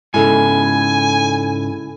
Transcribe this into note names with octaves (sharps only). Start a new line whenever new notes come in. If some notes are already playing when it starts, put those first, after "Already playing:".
G#2 C#3 E4 A4 G#5